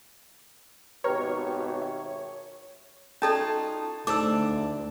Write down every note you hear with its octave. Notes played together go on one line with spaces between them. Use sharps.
G#1 B2 G4 B4 C#5 A#5 F6
E5
C#4 D#4 F4 F#4 A4 D5 A5
D2 G#2 A4 D5 A5 D6 E6